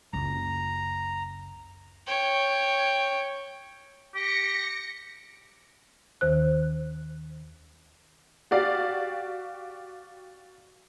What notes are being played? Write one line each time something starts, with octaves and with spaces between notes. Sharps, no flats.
F#1 C#2 A#5
C#5 G5
G4 A#6 C#7
D#2 D#3 C5 F#6
F#4 G4 D5 F5